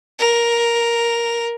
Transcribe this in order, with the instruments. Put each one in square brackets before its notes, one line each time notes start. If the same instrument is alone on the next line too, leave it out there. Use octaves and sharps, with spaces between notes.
[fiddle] A#4